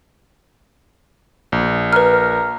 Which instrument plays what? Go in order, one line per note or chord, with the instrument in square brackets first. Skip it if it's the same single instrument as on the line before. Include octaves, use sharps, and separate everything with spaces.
[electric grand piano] A#1
[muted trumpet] A#4 [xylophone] B4 F6